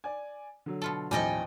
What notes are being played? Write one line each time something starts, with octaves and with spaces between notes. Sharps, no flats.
D5 G#5
D3 F#3
B2 F4 A4
A1 D#2 F3 G3 A4 D#5 G5 G#5